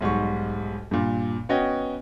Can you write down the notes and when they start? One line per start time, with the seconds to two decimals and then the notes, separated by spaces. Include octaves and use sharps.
0.01 B1 G#2 G3 C#6
0.91 G2 A#2
1.49 B3 C#4 F#4 D#5 G5